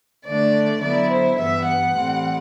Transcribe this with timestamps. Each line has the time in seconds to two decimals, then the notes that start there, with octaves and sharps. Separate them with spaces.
0.24 D3 A3 D4 D5
0.81 D3 F#3 B3 E4 D5
1.09 C5
1.37 G2 E3 G3 B3 E5
1.65 F#5
1.95 A2 E3 G3 C4